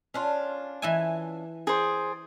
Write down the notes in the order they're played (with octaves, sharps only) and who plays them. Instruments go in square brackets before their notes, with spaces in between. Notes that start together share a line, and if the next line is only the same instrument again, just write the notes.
[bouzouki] C#4 D4 F4
[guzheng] E3 E5 G#5
[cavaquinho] G#4 C5 D5